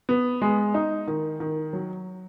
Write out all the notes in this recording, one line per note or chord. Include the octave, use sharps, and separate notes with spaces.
B3
G#3
D#4
D#3
D#3
F#3